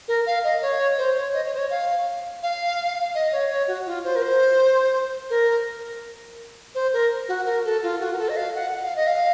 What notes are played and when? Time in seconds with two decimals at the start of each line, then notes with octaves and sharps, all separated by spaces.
0.08 A#4
0.26 F5
0.44 D#5
0.62 C#5
0.98 C5
1.16 C#5
1.34 D#5
1.46 C#5
1.54 C5
1.58 C#5
1.70 F5
2.43 F5
3.15 D#5
3.32 C#5
3.50 C#5
3.68 F#4
3.86 F4
4.04 C5
4.16 A#4
4.22 C5
5.30 A#4
6.75 C5
6.93 A#4
7.29 F#4
7.46 A#4
7.65 A4
7.83 F4
8.00 F#4
8.13 A#4
8.18 A4
8.29 D#5
8.37 F5
8.55 F#5
8.73 F#5
8.84 F5
8.96 D#5
9.07 F5